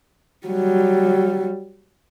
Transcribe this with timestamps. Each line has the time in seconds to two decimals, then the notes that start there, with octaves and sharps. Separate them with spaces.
0.47 F#3 G3